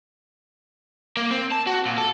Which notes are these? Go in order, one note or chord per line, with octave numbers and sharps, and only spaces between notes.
A#3
C4
A5
F#4
A#2
A4